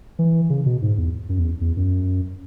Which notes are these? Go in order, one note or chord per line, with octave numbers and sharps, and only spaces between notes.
E3
C#3
B2
G#2
E2
F#2
E2
E2
F#2